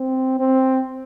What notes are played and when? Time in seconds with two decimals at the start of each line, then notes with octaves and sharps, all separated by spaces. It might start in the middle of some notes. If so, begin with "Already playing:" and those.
Already playing: C4
0.39 C4